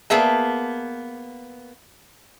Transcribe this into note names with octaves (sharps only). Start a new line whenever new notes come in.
A#3 B3 G#4 E5 A5